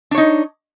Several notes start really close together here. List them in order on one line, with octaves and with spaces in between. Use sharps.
D4 C#5 D#4